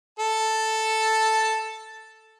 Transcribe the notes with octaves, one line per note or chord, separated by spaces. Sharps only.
A4 A5